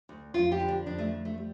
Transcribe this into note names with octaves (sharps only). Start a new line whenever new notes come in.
D2
F2 F4
G4
D3
D4
F2 D4
A3
F2
A3
G3